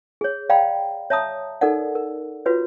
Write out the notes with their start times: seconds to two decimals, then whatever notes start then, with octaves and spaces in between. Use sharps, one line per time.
0.21 G#4 C#5
0.49 D5 F5 G5 A#5 B5
1.10 C#5 E5 A5 A#5 D#6
1.61 D#4 A4 A#4 D5 F#5
1.95 A#4
2.46 F4 F#4 B4 C#5